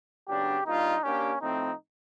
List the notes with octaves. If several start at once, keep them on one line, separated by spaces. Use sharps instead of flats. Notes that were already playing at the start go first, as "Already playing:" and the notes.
C#3 F#3 B3 D4 G4
G3 A#3 D4 D#4 F4
A#3 C#4 D4 G4
A2 F3 A3 C4 D#4